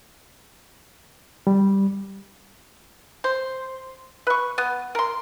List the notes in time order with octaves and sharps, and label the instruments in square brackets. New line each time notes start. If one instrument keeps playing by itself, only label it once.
[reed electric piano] G3
[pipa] C5
B4 C#6
B3
A#4 C6